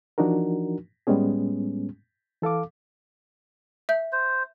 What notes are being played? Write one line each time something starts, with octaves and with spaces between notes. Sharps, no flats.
E3 F3 D4 D#4 F#4 A#4
A2 G3 G#3 B3 C#4 G#4
E3 A4 F5 D6
E5 G6
C5